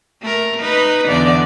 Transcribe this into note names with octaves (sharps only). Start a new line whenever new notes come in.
A3 A#4
D#4 B4
E2 D3 D5